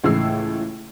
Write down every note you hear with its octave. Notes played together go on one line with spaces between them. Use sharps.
C#2 A2 E3 E6 C7